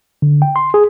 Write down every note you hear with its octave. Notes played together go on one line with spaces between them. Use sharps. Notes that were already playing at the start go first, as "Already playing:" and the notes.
D3
G5
C6
G#4